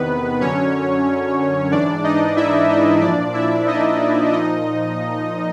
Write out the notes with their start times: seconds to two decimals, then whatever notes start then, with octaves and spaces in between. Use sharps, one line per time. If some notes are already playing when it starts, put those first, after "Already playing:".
Already playing: E2 C3 D#3 B3 B4
0.41 F#2 D3 F#3 C#4 C#5
1.71 G#2 E3 D4 D5
2.04 D#4 D#5
2.37 E4 E5
2.69 D#4 D#5
3.01 A#2 F3 D4 D5
3.34 E4 E5
3.67 D#4 D#5
4.32 A#2 F3 D#4 D#5